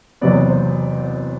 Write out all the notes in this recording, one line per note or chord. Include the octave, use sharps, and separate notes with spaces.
F#1 E2 C3 F#3 B3 D5
C5